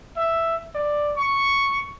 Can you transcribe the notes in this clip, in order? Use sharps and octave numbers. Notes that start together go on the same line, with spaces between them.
E5
D5
C#6